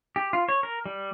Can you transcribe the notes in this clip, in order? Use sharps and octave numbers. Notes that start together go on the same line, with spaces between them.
G4
F4
C#5
A#4
G3